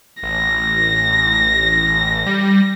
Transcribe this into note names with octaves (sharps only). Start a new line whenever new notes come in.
A1 A#6
G3